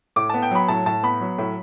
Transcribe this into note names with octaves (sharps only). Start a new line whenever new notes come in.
A2 D6
B3 A5
G5
F#3 B5
A2 A5
A2 A5
B3 B5
F#3
A2